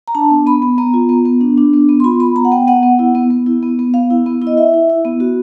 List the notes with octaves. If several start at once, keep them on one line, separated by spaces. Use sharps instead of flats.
A#5
D4 A5
B3
B3 B5
B3
B3 A#5
F4
B3
B3
D4
D4
B3
B3
C6
F4 B5
B3 B5
B3 A#5
F#5
B3 G5
B3 F#5
B3
E4
B3
B3
E4
B3
B3
B3 F5
E4
B3
E4
D#5
E4 E5
E4
E4
B3
F#4